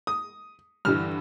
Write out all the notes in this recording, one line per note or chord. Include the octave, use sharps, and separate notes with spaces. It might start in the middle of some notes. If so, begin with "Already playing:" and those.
D#6
G2 D3 E3 F6